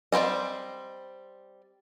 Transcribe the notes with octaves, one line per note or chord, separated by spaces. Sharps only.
G3 C4 B4 C5 D#5